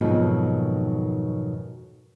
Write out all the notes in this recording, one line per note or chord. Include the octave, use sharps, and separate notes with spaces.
F2 G#2 B2 D#3 F#3